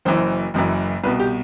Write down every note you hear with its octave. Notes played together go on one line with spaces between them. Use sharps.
F#1 F#2 E3 C5
F#1 F#2 E3
C2 B2 B4
G4